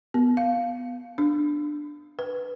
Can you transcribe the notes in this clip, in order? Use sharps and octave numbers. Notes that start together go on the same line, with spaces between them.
B3
F5
D4
B4